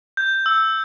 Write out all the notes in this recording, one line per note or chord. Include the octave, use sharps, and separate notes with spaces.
G6
E6